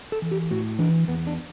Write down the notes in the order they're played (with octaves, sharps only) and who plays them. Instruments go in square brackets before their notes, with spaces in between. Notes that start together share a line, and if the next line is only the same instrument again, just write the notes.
[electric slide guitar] A4
E3
G4
A2 F#4
E3 D4
E2 B3
D4